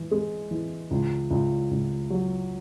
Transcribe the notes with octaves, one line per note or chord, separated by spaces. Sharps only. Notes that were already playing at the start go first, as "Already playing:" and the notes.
Already playing: E3
G#3
E3
C#2
C#2
C#2
F#3